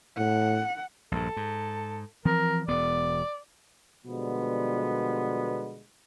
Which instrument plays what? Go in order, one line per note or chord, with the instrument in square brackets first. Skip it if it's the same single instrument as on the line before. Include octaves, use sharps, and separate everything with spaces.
[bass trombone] A2 [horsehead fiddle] F#5
[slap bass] A#1 G2 [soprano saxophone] A4
[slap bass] G#2
[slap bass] E3 F3 C4 [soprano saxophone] A#4
[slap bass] E1 B3 [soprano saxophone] D5
[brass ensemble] B2 D3 F3 G3 G#3 B3